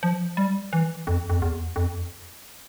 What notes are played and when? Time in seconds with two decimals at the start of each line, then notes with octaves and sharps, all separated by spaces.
0.03 F3
0.37 G3
0.73 E3
1.07 F2
1.30 F2
1.42 E2
1.76 F2